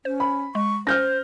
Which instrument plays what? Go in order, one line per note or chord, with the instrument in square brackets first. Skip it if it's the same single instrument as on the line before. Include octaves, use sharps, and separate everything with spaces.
[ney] C#4 [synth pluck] C5
[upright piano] B5
[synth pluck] G#3 [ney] C#6
[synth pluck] C#4 [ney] C5 [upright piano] F6 G6 A#6